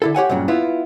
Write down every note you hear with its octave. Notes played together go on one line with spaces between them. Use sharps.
D3 E4 A4
G4 C#5 F#5 G#5
G2 A#2 C#3 F#3
B3 E4 F4